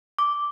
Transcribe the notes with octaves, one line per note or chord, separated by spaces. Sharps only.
D6